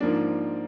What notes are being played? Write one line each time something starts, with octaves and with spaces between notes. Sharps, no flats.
G#2 F3 A#3 D4